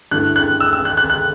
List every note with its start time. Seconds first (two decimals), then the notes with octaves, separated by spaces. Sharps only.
0.11 G2 D3 A3 E4 F#6
0.36 F#6
0.60 E6
0.73 E6
0.85 F#6
0.97 F#6
1.10 F#6